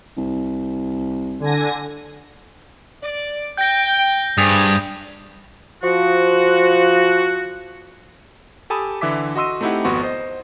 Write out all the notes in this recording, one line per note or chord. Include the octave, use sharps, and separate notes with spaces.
C2
D3 G#5 A#6
D5
G5 G6 A#6
G2 G#4 C5 G#5 D#6 A6 F7
F3 F#4
G4 A4 G#5 A5 B5 D#6
D3 E3 E5 D6 B6
F#4 D#5 C6 E6 D#7
A3 C4 D#4 E4 G4 F#5
G#1 F2 B3 F#4 C6 C#6
C5 D#5